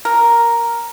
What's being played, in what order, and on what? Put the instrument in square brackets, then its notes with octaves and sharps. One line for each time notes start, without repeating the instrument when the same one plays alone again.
[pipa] A#4